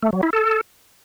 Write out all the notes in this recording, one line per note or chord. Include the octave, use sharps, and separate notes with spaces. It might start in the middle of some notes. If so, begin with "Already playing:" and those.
A3
F#3
E4
A4